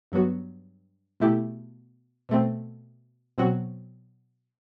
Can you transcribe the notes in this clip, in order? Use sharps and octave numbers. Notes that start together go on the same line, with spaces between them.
G2 F#3 B3 F#4
B2 A3 E4 G4
B2 A3 C4
B2 F#3 C4 F#4